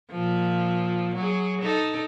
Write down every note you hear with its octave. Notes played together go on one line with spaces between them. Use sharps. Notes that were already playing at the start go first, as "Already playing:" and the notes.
A#2 F3
F#3 G#4
D#4 A4